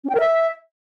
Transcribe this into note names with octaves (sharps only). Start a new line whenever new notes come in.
C#4
G5
A#4
E5